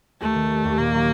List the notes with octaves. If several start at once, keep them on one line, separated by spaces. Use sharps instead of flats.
D#2 A3
D#3
G3
D#2
A#2 A#3
F#3